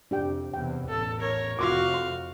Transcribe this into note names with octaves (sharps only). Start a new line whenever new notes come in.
F2 C3 D4 G4 G5
E2 C3 G5
A1 E2 A4
A#4 C#5
F1 F2 F4 F#4 F5 C6 D6
C6